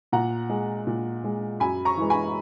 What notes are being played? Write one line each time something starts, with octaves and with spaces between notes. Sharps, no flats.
A#2 F#5 A#5
G#3
A#2
G#3
F#2 G#5 B5
A#5 C#6
E3 G#3
G#5 B5